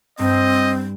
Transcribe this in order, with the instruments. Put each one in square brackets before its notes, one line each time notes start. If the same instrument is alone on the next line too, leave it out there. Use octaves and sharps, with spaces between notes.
[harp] G2 [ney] C4 [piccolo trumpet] D#5